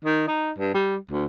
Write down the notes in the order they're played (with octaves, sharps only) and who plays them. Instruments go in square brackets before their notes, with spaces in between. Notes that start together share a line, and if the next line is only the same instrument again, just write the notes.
[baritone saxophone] D#3
D#4
G2
G3
D2